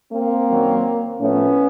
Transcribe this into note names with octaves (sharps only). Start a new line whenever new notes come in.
A#3 C4
F#2 D#3 F#3
A2 F3 A3 B3 C#4